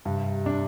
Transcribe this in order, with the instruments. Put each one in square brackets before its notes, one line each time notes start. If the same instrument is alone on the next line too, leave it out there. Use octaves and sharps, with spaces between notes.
[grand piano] G2 [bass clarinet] C3
[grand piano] D4